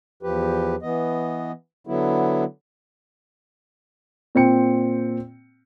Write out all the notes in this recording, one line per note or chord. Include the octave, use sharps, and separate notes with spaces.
E2 F3 G4 B4
E3 B3 D#5
D3 F#3 B3 E4
A#2 C4 G5 C#7